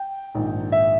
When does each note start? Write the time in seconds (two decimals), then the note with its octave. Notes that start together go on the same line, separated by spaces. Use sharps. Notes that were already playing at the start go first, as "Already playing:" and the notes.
Already playing: G5
0.35 A#1 G#2 D#3
0.72 E5